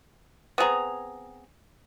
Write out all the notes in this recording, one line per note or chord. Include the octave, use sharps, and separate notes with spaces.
B3 C4 G#4 A#5